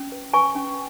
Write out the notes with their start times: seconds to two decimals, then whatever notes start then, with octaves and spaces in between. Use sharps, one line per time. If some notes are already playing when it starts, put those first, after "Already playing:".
Already playing: C#4
0.12 B4
0.34 B4 G#5 C#6
0.55 C#4